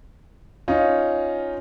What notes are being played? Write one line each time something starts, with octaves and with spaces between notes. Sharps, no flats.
C#4 D#4 F4